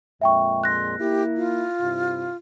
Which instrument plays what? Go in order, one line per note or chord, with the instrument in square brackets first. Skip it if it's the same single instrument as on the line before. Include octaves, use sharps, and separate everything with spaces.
[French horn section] F2 A#2 G#3 [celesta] E5 G5 C#6
[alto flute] C6 [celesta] F#6 A#6
[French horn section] A#3 E4 [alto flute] G4
[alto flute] F4
[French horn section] G2 C3 E4